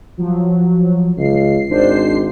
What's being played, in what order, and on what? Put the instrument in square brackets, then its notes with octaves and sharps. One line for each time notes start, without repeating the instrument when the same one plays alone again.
[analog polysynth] F3 F#3
[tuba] C#2 [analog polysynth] C7
[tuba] G#1 [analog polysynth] D4 C5 C7